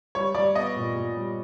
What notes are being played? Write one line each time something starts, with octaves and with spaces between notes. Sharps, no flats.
G3 C#5
G3 D5
B3 D#5
A#2
A#2
G3